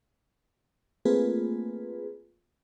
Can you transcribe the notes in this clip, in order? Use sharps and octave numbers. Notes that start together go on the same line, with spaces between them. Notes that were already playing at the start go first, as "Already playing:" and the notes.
A3 A#3 C4 F4 G#4 B4